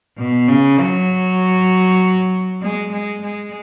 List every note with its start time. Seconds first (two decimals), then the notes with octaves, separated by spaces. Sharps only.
0.18 B2
0.48 C#3
0.79 F#3
2.62 G#3
2.92 G#3
3.22 G#3